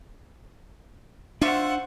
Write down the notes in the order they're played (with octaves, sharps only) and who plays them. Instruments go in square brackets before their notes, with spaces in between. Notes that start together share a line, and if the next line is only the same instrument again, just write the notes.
[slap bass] D4 [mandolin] F4 E5 C#6 [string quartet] C5 F#5